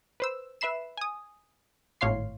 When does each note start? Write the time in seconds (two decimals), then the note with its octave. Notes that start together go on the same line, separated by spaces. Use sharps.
0.20 B4 C5 E6
0.61 B4 E5 B5 C7 E7
0.97 G#5 D#6
2.01 G#1 A2 C#5 F5 C6 C7